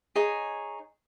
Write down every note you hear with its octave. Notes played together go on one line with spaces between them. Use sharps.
D#4 G#4 C#5